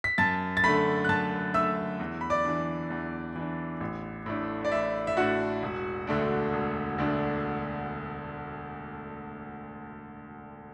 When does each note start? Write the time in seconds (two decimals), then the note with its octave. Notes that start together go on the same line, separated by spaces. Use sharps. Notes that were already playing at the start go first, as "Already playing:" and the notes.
0.04 B6
0.18 F#2 A5 A6
0.57 A6
0.64 D3 A3 B5 B6
1.04 F#6
1.09 F#2 A5 A6
1.54 D3 A3 E5 E6
2.00 E2
2.21 B5
2.30 D5 D6
2.45 E3 D4
2.90 E2
3.36 E3 D4
3.81 A1
4.26 A2 A3 D4
4.65 D5
4.72 A1 E5
5.07 E5
5.17 A2 A3 D4 F#4 F#5
5.63 E1
6.07 D2 D3 A3 D4
6.53 E1
6.98 D2 D3 A3 D4